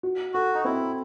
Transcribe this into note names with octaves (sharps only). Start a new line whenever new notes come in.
F#4
F#4 A4
D#4
C4 E4